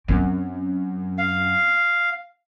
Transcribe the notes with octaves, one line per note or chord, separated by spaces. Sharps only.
F#2 C4
F5